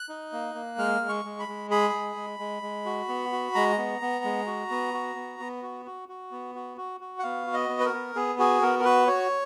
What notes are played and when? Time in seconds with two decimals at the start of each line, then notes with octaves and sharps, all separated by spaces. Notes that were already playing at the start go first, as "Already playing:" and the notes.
Already playing: F#6
0.09 D#4
0.33 A#3
0.55 A#3
0.78 G#3 F6
1.01 G#3
1.09 C#6
1.25 G#3
1.39 B5
1.48 G#3
1.71 G#4 B5
1.94 G#3
2.16 G#3
2.39 G#3
2.63 G#3
2.86 F#4
3.08 B3
3.32 F#4
3.55 G#3 A#5
3.78 B3
4.01 B3
4.25 G#3
4.46 F#4
4.71 B3
4.94 F#4
5.16 B3
5.40 B3
5.62 F#4
5.86 F#4
6.09 F#4
6.31 B3
6.55 F#4
6.78 F#4
7.01 F#4
7.19 F#5
7.23 B3 F5
7.47 F#4
7.54 D#5
7.69 B3
7.80 B4
7.85 A#4
7.93 B3
8.15 B3 G#4
8.39 F#4 G#4
8.62 B3 A#4
8.79 A#4
8.84 F#4 B4
9.07 F#4 C#5